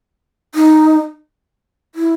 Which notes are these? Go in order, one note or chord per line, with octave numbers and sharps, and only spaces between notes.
D#4
E4